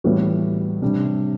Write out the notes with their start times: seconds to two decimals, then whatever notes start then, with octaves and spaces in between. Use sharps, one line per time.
0.04 A2 E3 G3 B3 F#4
0.82 C3 G3 D4